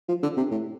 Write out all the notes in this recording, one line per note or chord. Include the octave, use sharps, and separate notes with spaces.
F3
D3
C3
A2